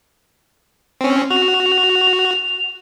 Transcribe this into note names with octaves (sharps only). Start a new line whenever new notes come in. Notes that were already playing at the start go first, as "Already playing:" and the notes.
C4 C#4
F#4 F7